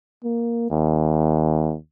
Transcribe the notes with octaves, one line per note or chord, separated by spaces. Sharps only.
A#3
D#2